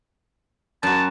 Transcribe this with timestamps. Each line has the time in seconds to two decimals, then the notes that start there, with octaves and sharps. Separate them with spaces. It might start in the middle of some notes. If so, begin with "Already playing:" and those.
0.83 F#2 F#4 A5